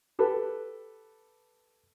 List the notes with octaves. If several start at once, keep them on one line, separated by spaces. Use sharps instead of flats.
G4 A4 B4